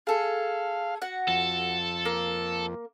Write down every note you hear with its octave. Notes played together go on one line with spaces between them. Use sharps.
G#4 A4 F5
F#4 F#5
F2 A4
A#3